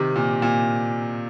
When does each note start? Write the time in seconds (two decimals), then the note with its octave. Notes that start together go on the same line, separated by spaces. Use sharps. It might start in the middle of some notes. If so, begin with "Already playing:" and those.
Already playing: C3 D#3
0.16 A#2
0.42 A#2